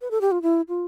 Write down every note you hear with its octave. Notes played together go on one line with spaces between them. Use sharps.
B4
A4
G4
F4
E4
F4